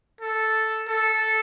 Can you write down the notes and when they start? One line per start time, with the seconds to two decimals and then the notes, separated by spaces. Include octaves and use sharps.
0.21 A4
0.88 A4